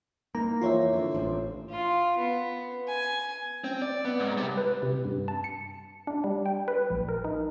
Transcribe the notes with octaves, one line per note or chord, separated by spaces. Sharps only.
A#3 D#4 A#5
F2 E3 F4 C5 C#5 E5
D3
A1 D4 C5
F4
B3
G#5
C4
D5
B3
G#2
C2 G3
B4
C3
G2
A5
C#7
D4
G3
G5
B4
A#1
A#4
D#4